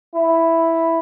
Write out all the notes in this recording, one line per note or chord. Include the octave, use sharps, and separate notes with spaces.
E4